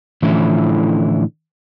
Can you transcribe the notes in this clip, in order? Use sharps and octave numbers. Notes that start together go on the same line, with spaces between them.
A2 D3 E3 F3 C#4 E4